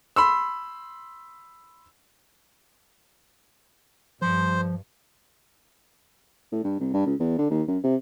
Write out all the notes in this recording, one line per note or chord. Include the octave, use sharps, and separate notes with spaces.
B5 C6 E6
G2 F3 C5
A2
G2
C2
G2
C#2
E2
D3
D#2
F#2
C3